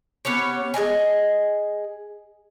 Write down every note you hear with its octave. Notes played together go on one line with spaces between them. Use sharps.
B3 C#4 G4 C#5
G#4 D5 D#5 G#5